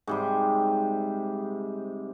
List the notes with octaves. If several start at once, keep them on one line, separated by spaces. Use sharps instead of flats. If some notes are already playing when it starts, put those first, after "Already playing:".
G#2 C3 G3